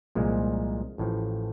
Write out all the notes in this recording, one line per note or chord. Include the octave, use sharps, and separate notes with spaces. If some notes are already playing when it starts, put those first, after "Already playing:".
C2 A#2 F3 G#3
A1 A2 F3